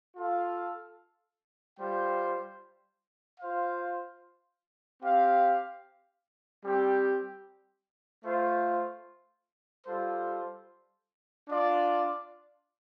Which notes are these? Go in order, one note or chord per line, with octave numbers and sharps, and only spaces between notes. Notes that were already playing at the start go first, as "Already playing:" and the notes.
F4 A4 F5
G3 F4 C5 G5
F4 C5 F5
C4 G4 F5
G3 C4 G4
A3 F4 C5
G3 F4 A4 C5
D4 F4 D5